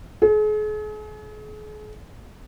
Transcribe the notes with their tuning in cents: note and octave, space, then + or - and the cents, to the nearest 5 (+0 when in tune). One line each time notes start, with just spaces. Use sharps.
G#4 +40